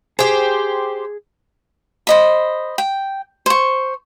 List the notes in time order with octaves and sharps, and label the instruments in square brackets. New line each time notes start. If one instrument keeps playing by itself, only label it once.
[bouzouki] G4 C5 [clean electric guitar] G#4
[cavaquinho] C5 D#5 B5
G5
C5 C#6